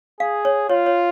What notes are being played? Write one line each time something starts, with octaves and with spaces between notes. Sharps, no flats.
G#4 F5
C#5
F4 C#5
C#5